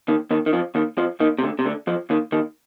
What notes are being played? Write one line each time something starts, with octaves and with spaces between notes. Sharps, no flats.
D#2 D#3
D#2 D#3
D#3
F2 F3
D#2 D#3
F2 F3
D#2 D#3
C3
D2 D3
C3
D2 D3
F2 F3
D#2 D#3
D#2 D#3